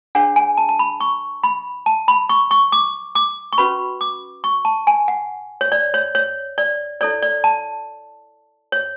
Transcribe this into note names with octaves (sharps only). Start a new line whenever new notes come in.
D4 G#4 C#5 F#5
G#5
A5
A5
B5
C#6
B5
A5
B5
C#6
C#6
D6
D6
C#6
C#4 F#4 B4 B5
D6
C#6
A5
G#5
F#5
C#5
D5
C#5
C#5
D5
E4 A4 C#5 D5
D5
A5
C#5